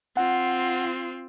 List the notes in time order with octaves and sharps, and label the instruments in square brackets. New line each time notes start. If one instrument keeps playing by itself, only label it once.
[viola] C4 F4 [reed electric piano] F#5